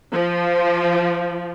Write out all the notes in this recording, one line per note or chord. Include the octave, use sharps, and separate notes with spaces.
F3